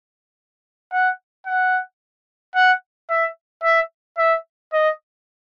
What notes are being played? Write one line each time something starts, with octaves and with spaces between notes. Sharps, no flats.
F#5
F#5
F#5
E5
E5
E5
D#5